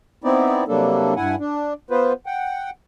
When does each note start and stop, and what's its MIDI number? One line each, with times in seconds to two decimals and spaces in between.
0.24 0.64 59
0.24 0.64 60
0.24 0.64 63
0.24 0.64 64
0.24 0.64 74
0.68 1.14 48
0.68 1.14 54
0.68 1.14 55
0.68 1.14 58
0.68 1.14 62
0.68 1.14 69
1.16 1.35 43
1.16 1.35 64
1.16 1.35 78
1.16 1.35 80
1.39 1.73 62
1.90 2.13 59
1.90 2.13 65
1.90 2.13 71
1.90 2.13 72
2.26 2.70 78
2.26 2.70 79